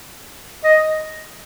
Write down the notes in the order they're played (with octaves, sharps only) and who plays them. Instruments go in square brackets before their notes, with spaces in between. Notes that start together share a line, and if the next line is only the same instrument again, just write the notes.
[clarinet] D#5